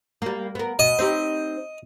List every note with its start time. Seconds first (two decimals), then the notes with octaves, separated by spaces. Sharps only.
0.22 G3 A#3
0.55 B3 A#4
0.79 B2 D#5
0.99 C4 D#4 G4